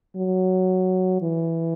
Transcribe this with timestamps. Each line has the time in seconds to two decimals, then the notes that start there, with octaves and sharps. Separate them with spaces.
0.17 F#3
1.22 E3